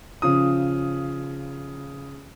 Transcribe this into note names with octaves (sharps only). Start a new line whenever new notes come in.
C#3 F3 D#6